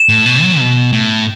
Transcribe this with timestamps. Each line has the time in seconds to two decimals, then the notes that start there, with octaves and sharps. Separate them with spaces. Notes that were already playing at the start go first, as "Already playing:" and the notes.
Already playing: E7
0.09 A2
0.26 B2
0.43 F#3
0.59 B2
0.92 A2